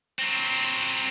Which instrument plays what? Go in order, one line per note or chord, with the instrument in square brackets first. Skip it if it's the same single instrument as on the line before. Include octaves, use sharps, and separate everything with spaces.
[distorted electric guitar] F#3 C4